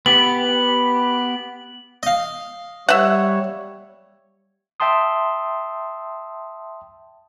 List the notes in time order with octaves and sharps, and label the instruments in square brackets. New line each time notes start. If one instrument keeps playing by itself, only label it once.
[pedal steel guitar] B3 G4 [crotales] F#7
[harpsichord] D#5 F5
[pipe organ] G3 C#5 [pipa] E5 F#5
[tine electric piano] E5 G5 A5 C6 D#6